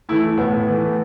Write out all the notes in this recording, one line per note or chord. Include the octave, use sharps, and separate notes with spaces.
E3 A3 E4
A2 B3
E3 A3